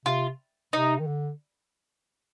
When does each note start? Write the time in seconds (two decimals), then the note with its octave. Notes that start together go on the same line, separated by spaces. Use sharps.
0.05 C3 F4
0.73 C3 D#4
0.99 D#3
1.07 D3